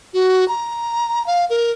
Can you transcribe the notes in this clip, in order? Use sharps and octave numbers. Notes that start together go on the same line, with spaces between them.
F#4
A#5
F5
A#4